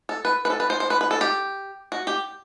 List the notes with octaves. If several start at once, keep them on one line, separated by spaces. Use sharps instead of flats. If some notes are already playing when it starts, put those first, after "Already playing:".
A4
B4
B4
A4
B4
C5
C5
B4
B4
A4
G4
F#4
G4